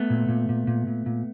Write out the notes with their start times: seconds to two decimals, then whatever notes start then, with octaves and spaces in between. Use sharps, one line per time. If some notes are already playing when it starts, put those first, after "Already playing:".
Already playing: A3 B3
0.10 A#2
0.28 A#2
0.49 A#2
0.67 A#2
0.87 A#2
1.06 A#2